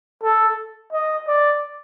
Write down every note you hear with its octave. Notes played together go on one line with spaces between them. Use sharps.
A4
D#5
D5